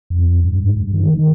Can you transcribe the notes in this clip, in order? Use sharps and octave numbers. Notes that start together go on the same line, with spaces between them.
F2
G2
G#2
G2
D#3
D#3